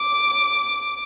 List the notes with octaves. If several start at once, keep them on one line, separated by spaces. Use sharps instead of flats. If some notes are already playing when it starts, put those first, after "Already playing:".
Already playing: D6